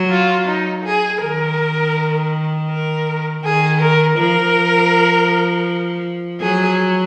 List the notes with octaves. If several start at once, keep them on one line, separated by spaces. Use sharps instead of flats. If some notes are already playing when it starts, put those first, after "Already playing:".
Already playing: F#3
F4
D#4
G#4
D#3 A#4
A#4
D#3 G#4
A#4
F3 A#4
F#3 G#4